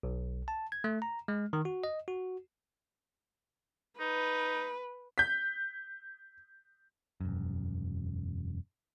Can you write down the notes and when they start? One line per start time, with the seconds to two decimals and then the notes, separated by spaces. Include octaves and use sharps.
0.03 B1
0.48 A5
0.72 G#6
0.84 A3
1.02 A#5
1.28 G#3
1.53 D#3
1.65 F#4
1.84 D#5
2.08 F#4
4.00 D#4 B4
5.18 G6 B6
7.21 E1 F#2